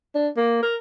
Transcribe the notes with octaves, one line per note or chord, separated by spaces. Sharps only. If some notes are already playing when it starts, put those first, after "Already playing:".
D4
A#3
A#4